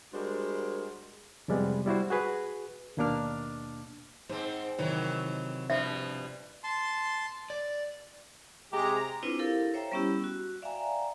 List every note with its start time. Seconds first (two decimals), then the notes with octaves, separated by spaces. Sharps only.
0.13 G3 G#3 D4 F#4 A#4 C5
1.48 F2 C3 G3 G#3 B3
1.86 G3 E4 F#4 C5
2.10 F#4 G#4 B4
2.97 D#2 B2 A#3 D4 D6 F6
4.29 G#2 C4 C5
4.78 C3 D#3 E3 F#3
5.70 G2 B2 F3 E5
6.64 A5 C6
7.50 D5
8.72 C3 G#3 G4 G#4 A#5
9.23 C4 D4 E4 F4 B4 C5
9.39 E4 G4 A4 A#4 F5
9.74 C5 C#5 E5 G5 A#5
9.92 G3 B3 C#4 E4 G4 E6
10.24 F#4
10.62 D5 E5 F5 G5 G#5 A#5